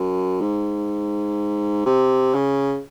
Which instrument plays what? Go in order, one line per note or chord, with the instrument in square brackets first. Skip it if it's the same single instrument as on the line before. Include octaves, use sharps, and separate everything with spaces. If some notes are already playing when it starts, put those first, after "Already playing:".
Already playing: [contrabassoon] F#2
G#2
C3
C#3